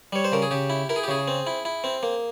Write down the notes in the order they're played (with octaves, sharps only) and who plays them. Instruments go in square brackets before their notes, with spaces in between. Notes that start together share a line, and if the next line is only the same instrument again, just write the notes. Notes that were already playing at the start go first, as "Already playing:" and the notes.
[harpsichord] G3 C#5
C5
C#3 A#4
G#4
C#3 G4
E4
E4 A#4
G#4
G4
C#3 G#4
C4
E4
E4
C4
A#3